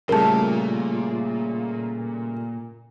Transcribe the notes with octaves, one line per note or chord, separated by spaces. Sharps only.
A#2 C#3 G3 A3 A#4 A5